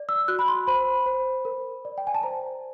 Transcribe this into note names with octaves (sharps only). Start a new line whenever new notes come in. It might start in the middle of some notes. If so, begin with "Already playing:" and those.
Already playing: D5
E6
F#4 F#6
B5
C6
C5 B5
C5
A#4
D5
G5
G#5
A5
C5 A#5